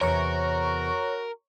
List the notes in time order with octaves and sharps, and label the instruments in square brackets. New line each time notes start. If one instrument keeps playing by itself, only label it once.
[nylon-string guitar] E2 C3 [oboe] F#4 [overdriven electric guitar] A#4 [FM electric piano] C#5 A#5 C#6